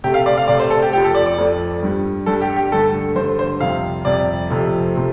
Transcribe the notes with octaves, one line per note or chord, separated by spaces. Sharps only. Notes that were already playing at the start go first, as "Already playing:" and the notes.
C3 A3 G4
F5
D5
F5
C3 A3 D5
C5
A4
G4
F2 F3 A3 G4
A4
D5
D5
F2 F3 A3
G2 G3
G2 G3 A4
G4
G4
G2 D3 A3 A4
G2 D3 A3 C5
C5
F2 C3 G3 F5
F2 C3 G3 D5
F2 C3 F3 A3
C3 F3 A3